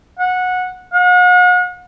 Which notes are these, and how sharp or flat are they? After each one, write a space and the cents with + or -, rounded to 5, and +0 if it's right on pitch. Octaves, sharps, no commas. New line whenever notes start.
F#5 -15
F#5 -45